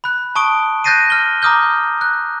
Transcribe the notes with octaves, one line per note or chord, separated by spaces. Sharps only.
B5 F#6
A5 C#6 D#6 D7 G7
F#6 G6 A6 A#6 C7 D#7
F6 G7
A#5 D6 D#6 F6 G6 G7
F#6